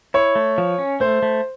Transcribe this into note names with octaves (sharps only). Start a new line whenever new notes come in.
E4 C#5
A3
F3
C#4
A3 C5
A3